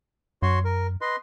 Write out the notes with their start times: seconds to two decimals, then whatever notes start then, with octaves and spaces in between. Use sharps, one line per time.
0.42 F#2 F#4 C#5 C6
0.65 A#4
1.01 B4 D#5 C6